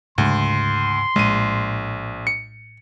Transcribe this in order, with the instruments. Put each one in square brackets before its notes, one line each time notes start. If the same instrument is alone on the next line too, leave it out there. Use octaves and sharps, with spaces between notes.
[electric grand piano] D2 [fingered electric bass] G#2 C#3 G#3 [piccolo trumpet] C6
[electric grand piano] A#1 D#7 [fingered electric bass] A2 G#3
[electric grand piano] C#7